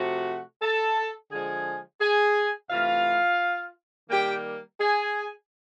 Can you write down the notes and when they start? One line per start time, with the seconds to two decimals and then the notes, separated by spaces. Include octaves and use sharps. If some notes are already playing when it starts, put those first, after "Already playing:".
Already playing: C3 F3 A3 F#4 F#5
0.61 A4 A5
1.31 D3 F3 G#3 G#4 G#5
2.01 G#4 G#5
2.70 C3 E3 A3 F4 F5
4.10 D#3 G3 A#3 G4 G5
4.80 G#4 G#5